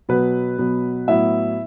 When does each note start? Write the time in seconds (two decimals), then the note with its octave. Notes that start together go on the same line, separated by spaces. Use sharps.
0.09 B2 F#3 B3 B4
0.58 B2 F#3 B3
1.08 A2 F#3 B3 E4 E5